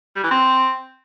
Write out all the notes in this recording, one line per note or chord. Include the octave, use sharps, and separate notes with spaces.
G3
E3
C4